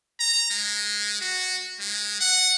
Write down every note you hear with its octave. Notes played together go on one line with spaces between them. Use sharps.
A#5
G#3
F#4
G#3
F#5